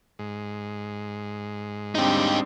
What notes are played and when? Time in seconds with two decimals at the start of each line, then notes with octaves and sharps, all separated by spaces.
0.19 G#2
1.95 G3 C4 D4 D#4 G4